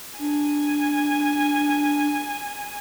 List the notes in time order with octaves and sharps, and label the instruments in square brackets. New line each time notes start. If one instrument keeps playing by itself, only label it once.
[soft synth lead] D4 [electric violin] G#5